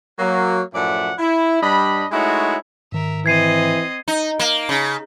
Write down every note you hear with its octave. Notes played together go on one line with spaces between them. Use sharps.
F#3 A#3
F#2 A2 F3 D5 E5 F#5
E4
G2 G3 D4 D#5 B5
G#3 A3 D#4 E4 F#4 C#5
G#2 D#3 A#4 E5
E3 C4 D#5 G#6 C7 D#7
D#4
A#3
C#3